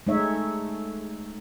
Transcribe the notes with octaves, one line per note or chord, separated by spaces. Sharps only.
G#3 A3 D#4 C#5 E5